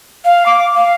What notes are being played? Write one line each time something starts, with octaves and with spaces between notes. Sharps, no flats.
F5
D6
F5